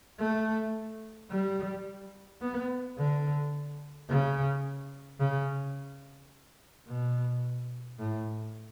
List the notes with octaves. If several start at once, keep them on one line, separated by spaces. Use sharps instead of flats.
A3
G3
B3
D3
C#3
C#3
B2
A2